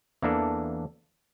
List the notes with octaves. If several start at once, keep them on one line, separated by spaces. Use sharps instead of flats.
E2 E3 A#3 D4 A4